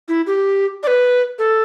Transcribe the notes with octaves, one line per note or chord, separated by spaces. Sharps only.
E4
G4
D5
B4
A4